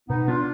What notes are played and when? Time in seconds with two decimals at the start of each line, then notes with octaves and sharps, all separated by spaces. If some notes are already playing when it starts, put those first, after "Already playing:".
0.09 B2 B3 D#4
0.28 B3 D4 F4